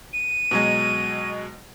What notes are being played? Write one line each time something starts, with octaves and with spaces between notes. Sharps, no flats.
D#7
B2 F#3 G#3